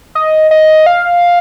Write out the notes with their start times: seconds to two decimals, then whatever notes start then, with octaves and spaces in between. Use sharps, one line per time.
0.15 D#5
0.51 D#5
0.86 F5